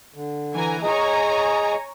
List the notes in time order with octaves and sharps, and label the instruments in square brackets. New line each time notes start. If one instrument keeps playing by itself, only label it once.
[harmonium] D3
[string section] E3 G#5 A#5
[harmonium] G#4 D#5 [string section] C#5 G#5 A#5